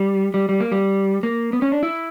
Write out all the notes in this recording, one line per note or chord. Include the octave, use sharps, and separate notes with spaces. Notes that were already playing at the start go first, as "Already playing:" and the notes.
Already playing: G3
G3
G3
A#3
G3
A#3
B3
C#4
D4
E4